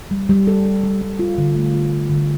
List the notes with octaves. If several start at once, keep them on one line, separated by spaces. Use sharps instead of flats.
G3
G3
A4
A4
G3
G3
F4
D3
A3
F4
F4
D3